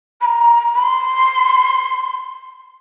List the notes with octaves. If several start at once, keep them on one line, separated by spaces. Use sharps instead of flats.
B5
A#5
B5
C6